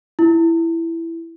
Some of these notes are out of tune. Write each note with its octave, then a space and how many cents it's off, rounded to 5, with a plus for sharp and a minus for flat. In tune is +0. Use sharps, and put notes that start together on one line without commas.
E4 +10